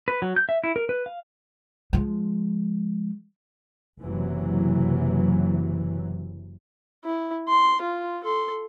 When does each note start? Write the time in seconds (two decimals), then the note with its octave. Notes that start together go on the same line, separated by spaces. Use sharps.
0.08 B4
0.22 F#3
0.36 G6
0.49 E5
0.64 E4
0.76 A#4
0.89 B4
1.06 F5
1.93 F3 G#3
4.00 F#1 F#2 C3 E3 F#3
7.05 E4
7.48 C6
7.82 F4
8.24 A4 C6